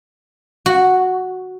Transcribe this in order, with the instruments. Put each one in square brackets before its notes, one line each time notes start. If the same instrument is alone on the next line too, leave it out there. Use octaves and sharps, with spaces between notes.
[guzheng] F#4